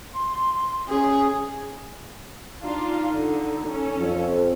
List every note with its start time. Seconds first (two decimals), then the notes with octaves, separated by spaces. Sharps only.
0.14 C6
0.89 C#4 G#4
2.61 D4 D#4 F4
3.12 D3
3.67 C#4 A4
3.97 F2 F3